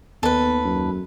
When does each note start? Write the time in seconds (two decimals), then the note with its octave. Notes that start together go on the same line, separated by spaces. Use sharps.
0.23 D#2 B3 A4 B4
0.65 F#2